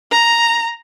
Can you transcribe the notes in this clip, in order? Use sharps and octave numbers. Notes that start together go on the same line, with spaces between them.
A#5